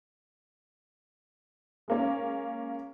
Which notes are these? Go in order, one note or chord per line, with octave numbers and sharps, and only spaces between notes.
G#3 A#3 C#4